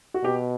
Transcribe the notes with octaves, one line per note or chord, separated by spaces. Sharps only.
F#4
B2 G4